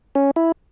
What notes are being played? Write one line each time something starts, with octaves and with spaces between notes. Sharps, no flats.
C#4
E4